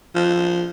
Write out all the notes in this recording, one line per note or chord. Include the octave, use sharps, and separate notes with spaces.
F3